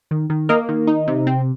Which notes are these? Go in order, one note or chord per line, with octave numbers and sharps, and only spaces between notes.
D#3
D#3
A#3 A#4 D#5
D#3
D#4
C3
C4